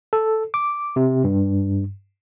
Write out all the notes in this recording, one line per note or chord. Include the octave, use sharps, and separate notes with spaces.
A4
D6
C3
G2